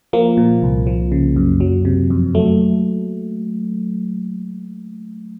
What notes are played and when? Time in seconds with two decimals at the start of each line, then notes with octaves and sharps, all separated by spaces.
0.13 F3 A#3
0.37 A#2
0.62 C2
0.87 F3
1.12 C#3
1.36 F#2
1.60 F#3
1.85 C3
2.10 F2
2.35 F#3 A3